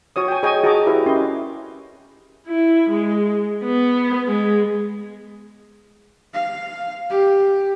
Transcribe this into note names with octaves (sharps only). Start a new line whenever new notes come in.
F#4 C#5 D#6
G5 G#5
G#4 C#5 D#5 G5 G#5
F#4 G#4 D#5 A5 A#5 D6
E4 G4 B4 E5
C#4 E4 G4 A#4 D#5 C6
E4
G#3
B3
G#3
F5
G4